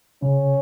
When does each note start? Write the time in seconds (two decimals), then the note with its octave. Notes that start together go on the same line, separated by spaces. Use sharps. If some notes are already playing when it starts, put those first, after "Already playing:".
0.22 C#3 C#4